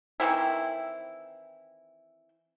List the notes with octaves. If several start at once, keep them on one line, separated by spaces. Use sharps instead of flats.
D#3 E3 C4 E4